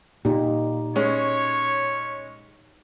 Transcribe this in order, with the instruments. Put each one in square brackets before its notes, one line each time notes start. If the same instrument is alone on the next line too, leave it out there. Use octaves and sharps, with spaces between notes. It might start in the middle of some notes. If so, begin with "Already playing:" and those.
[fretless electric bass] A#2 [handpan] D#4 G4
[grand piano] G#3 C#4 [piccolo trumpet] C#5